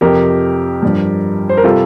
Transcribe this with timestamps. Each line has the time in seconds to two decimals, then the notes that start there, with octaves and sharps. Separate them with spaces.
0.01 F2 C3 F3 G4 A#4
0.83 G2 F3
1.49 C5
1.57 A#4
1.64 C3 G3 F4 A4